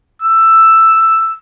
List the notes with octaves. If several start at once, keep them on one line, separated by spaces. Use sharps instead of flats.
E6